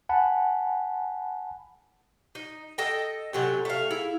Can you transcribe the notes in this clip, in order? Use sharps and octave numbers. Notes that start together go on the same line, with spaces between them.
F#5 G#5 A5 B5
D#4
A4 D#5 G5
C3 F#3 C#4 G4 A4 G5
A3 F5
E4 G#4 F5